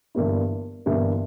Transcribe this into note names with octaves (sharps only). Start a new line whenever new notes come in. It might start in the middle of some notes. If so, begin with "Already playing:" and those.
G1 G2 E3 A#3 E4
G1 G2 E3 A#3 E4